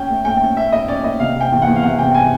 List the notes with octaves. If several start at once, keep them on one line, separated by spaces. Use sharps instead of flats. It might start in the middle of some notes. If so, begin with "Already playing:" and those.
Already playing: C#4 G5
A3
A3 G5
C#4
C#4 E5
A3 D#5
C#4 D5
A3 D#5
C3 F5
C3 G5
E2
E2 F#5
F5
C3 F#5
C3 G5
G#5